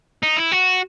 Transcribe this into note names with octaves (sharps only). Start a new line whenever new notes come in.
D#4
E4
F#4